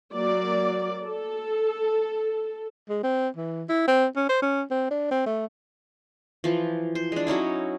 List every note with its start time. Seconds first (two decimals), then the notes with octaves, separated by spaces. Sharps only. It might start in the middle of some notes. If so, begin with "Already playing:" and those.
0.13 F#3 A#3 D5
1.04 A4
2.89 G#3
3.03 C4
3.36 E3
3.69 E4
3.88 C4
4.16 C#4
4.29 C5
4.42 C#4
4.71 C4
4.91 D4
5.11 C4
5.26 A3
6.44 E3 F3
6.95 C5
7.12 G#3 D4
7.27 F#3 C#4 D#4 E4